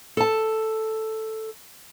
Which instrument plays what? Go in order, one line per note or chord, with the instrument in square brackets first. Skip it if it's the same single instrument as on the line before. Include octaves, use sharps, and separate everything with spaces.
[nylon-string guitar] A4 A5